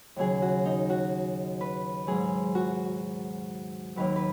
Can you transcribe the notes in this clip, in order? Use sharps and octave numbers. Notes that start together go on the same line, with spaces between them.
D#2 C#3 F#3 G#4
F#4
D#4
F#4
B4
G#2 F#3 G#4
F#4
D#2 D#3 F#3 B4
B4